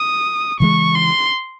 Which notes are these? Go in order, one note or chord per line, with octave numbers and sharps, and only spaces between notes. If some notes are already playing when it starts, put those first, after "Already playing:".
Already playing: D#6
C#3 E3 G#3 C#6
C6